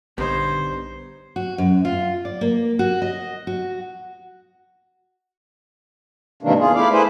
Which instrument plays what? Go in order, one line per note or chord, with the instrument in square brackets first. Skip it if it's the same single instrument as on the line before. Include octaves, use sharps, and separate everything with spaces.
[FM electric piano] A#1 D3 [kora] G2 D#4 C#5 [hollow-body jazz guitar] B3 [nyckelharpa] C5
[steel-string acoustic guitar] F#4
F#2
F4
D5
A#3
F#4
D#5
F#4
[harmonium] G#2 C3 D#3 E3 A#3 D4
E2 F4 G#4
A3 E4 D5 F5
A3 E4 G#4 B4 C5